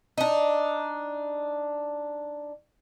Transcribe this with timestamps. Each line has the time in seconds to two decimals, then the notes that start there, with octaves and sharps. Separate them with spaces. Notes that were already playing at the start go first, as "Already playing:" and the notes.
0.18 D4 D#4